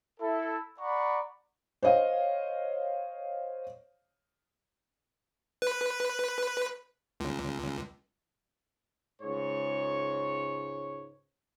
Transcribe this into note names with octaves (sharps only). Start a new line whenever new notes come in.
E4 A4
D5 F#5 A#5 B5 C#6
C5 C#5 D#5 F5
B4
C#2
C#2 G#2 C#5